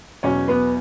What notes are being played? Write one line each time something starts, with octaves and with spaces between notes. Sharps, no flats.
E2 B2 F#3 C#4 C#5
B3 B4